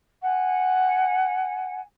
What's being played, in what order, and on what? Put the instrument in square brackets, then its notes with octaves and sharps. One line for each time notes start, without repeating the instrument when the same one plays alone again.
[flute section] F#5 G#5